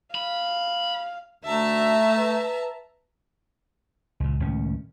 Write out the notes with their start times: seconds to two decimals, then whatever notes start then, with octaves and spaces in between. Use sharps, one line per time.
0.15 F5 B5
1.44 D2 A3 E5 A5 A#5
2.18 B4
4.20 C#2 A#2
4.40 C#2 A2 D#3 C#4